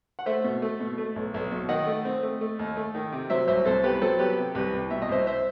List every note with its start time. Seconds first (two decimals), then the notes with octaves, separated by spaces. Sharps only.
0.19 F#5
0.26 A3 C5 E5
0.44 B2
0.62 A3
0.80 B2
0.98 A3
1.16 B1
1.34 B1
1.51 B2
1.69 D#3 D#5 F#5
1.87 A3
2.05 C4
2.23 A3
2.41 A3
2.59 D#2
2.77 A3
2.95 D#3
3.12 C3
3.30 F#3 C5 E5
3.48 C2 C5 E5
3.65 C2 A4 C5
3.83 B3 G4 B4
3.94 B4
4.02 F#3 A4 C5
4.19 B3 G4 B4
4.38 C3
4.55 C2 G4 B4
4.73 C2
4.91 B2 E5
5.02 D#5
5.09 C2 C5 E5
5.27 C5 E5